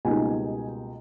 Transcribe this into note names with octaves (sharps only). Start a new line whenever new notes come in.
C#2 B2 G3 A#3 D#4 G#5